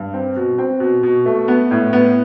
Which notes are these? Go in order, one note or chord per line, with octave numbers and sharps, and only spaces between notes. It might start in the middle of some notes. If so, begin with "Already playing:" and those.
Already playing: G2
C4
B2
C4
B2
B2
A3
B3
A2
B3